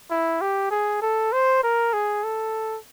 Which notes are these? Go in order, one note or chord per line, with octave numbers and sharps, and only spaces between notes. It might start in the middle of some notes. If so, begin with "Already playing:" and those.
E4
G4
G#4
A4
C5
A#4
G#4
A4